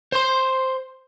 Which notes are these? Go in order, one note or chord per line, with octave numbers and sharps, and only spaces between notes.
C5 C6